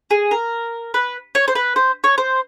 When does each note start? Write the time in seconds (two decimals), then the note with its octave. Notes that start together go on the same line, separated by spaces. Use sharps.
0.11 G#4
0.31 A#4
0.94 B4
1.35 C#5
1.48 C5
1.55 B4
1.76 C5
2.04 C#5
2.18 C5